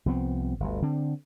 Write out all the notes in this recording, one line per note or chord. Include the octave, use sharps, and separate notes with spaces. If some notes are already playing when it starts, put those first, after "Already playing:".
C2 F3 B3 C4
G1 D2
D3 C4